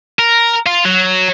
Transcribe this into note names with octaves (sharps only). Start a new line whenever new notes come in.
A#4
F4
F#3